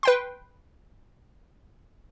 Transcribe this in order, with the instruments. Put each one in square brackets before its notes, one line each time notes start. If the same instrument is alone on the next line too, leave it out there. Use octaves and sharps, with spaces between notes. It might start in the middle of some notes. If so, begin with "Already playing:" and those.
[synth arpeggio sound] B4 G5 C6